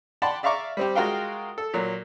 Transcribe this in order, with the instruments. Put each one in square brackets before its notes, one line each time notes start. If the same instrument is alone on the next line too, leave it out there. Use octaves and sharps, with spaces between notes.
[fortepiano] D5 F#5 G5 A5 B5 C6
D5 E5 F5 A#5 C#6 D6
G3 C4 G4
G#3 F4 F#4 A#4 F5 G5
A4
A#2 F#3